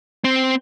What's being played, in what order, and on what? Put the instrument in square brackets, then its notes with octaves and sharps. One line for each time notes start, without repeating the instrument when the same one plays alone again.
[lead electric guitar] C4